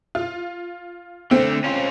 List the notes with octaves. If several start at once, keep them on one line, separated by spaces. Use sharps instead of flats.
F4
D3 A3 C4
C#4 F4